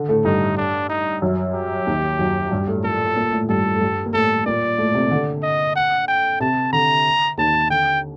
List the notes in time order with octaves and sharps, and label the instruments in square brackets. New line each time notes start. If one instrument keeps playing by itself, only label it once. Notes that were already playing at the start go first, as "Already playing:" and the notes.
Already playing: [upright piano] D3
A2 A3
[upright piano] G2 G3 [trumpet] D#4
[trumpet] D4
D#4
[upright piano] F#2 F#3
[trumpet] G4
[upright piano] D#2 D#3
F#2 F#3
G2 G3
A2 A3
[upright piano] A#2 A#3 [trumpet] A4
[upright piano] A#2 A#3
A2 A3
[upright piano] G2 G3 [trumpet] A4
[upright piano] A3
G2 G3
A#3
[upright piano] A2 A3 [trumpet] A4
[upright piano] A#2 A#3 [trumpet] D5
[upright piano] A2 A3
C3
D3
[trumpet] D#5
F#5
G5
[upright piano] C3 [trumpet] A5
[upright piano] D3 [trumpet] A#5
[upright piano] D#2 D#3 [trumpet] A5
[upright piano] D3 [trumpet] G5